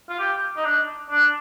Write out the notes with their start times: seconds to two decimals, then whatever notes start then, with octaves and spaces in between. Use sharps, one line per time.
0.10 F4
0.19 G4
0.57 D#4
0.65 D4
1.11 D4